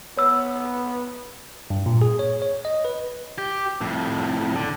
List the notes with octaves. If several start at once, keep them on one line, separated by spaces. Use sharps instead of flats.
B3 C#5 E6
G2
A#2
G#4
C#5
C#5
D#5
B4
G4
F2 A2
D3